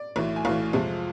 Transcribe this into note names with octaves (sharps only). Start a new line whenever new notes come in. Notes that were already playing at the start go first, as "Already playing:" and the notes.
Already playing: D5
B1 A2 E3
G#5
B1 A2 E3 F5
F2 C3 F3 G#3